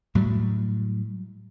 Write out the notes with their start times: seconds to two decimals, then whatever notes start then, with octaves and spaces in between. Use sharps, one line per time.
0.15 A2 F#3 G3